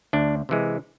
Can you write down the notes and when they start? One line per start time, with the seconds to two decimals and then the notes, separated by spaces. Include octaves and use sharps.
0.13 D2 D4
0.49 C3 E3 G#3